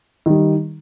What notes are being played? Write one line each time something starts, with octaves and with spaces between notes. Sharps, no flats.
D#3 G3